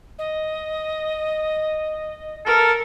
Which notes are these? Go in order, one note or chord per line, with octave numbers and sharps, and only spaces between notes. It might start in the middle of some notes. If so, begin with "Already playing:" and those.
D#5
A4 A#4